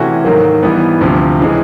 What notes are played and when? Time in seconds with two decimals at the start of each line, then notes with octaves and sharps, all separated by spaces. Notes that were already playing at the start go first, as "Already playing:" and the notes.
Already playing: C3 E3 A3 C#4 F#4
0.25 G#2 D#3 F#3 A#3
0.63 G#2 E3 G3 B3
1.01 D2 C3 F3
1.41 C#3 E3 G#3